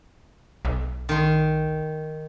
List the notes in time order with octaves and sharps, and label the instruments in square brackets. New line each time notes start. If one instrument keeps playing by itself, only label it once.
[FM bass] B1
[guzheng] D#3 C6